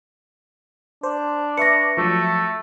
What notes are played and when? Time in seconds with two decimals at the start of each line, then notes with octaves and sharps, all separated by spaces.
1.03 D4 C5
1.57 B4 E5 C#6 A#6 C#7
1.97 F3 F#3 A3